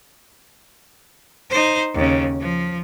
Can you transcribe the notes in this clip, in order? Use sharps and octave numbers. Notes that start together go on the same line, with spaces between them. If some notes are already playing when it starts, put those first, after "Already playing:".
D#4 C5
D#2 C#3
F3